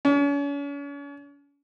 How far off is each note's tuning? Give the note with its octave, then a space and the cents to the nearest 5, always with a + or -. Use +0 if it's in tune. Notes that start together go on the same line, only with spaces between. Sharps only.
C#4 +40